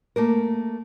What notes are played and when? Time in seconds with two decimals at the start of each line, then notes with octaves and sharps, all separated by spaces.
0.16 A3 A#3 A#4